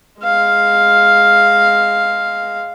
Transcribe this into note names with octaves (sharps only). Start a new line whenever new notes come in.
G#3 F5